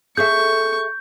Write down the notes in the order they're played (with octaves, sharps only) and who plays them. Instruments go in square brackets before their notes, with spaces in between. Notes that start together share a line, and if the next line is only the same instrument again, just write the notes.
[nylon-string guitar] G#4 A4 E5 [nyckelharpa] C#6 [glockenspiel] G6